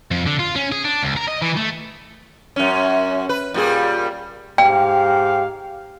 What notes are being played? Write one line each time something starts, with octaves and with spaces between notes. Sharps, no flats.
F2
D3
F4
C#4
G#4
D4
C#2
A#4
D#5
E3
A3
F#2 C#4
B4
A#2 G3 G#4
G#2 G4 F5 G5